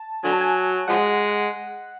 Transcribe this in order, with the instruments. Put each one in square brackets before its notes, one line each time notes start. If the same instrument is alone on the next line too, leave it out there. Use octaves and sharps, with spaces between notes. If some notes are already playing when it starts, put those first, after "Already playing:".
Already playing: [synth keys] A5
[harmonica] D3 F#3 [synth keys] G#5
[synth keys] A5
G#5
[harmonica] F3 G#3 [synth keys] F#5